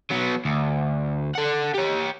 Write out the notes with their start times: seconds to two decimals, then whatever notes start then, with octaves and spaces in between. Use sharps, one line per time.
0.10 F#3 B3
0.45 D2
1.35 A4 F#5
1.75 G4 C#5